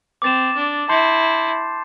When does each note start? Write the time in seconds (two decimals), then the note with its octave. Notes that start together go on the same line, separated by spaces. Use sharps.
0.22 C4 D6 A6 E7
0.56 D4
0.89 E4 A5 C6 G6 C7